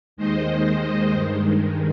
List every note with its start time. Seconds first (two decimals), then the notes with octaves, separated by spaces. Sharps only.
0.17 D#2 D#3 G#3 C5 D#5
1.11 G2 D#3 G#3